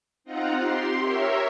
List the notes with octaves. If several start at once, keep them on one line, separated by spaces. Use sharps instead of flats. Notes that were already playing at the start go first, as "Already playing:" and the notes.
C4 D#4 F4 F#5 A#5
G4 C6
A#4 C#5 E5